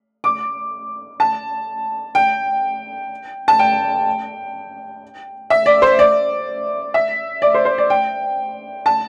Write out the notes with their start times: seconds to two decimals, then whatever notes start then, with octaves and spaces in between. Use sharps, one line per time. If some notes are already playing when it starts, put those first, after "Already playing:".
0.24 D6
1.20 A5
2.15 G5
3.48 A5
3.59 G5
5.50 E5
5.66 D5
5.82 C5
5.99 D5
6.94 E5
7.42 D5
7.55 C5
7.65 C5
7.78 D5
7.90 G5
8.86 A5